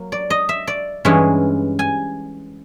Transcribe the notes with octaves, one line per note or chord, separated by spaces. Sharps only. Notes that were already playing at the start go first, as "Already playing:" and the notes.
Already playing: F#3 A#3
D5
D#5
E5
D5
G2 E3 G#3 C#4
G#5